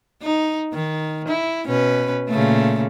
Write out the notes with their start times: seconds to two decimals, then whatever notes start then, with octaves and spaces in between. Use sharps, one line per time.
0.22 D#4
0.73 D#3
1.28 E4
1.66 B2 C#4 B4
2.29 A#2 C#3 A3